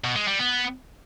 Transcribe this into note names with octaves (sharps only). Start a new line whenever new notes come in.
B2
G#3
G3
B3